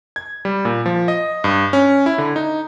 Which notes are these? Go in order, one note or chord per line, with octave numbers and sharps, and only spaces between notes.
G#6
G3
A#2
F3
D#5
G2
C#4
E4
D3
D#4